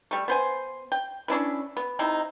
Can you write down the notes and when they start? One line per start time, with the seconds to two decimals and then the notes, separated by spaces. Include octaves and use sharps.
0.11 G3 A3
0.28 B3 C5 G#5
0.92 G5
1.28 C#4 D4 E4 B4
1.77 B3
1.99 C3 D#4 E4